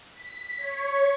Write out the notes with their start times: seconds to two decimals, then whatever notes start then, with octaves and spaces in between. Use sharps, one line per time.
0.13 B6
0.57 C#5